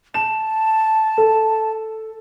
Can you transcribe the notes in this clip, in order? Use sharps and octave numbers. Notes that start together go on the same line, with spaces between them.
A5 E7
A4